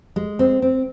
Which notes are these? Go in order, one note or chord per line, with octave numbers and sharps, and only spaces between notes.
G#3
C4
C4